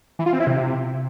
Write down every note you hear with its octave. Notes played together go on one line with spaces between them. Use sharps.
E3
F4
C4
E4
C3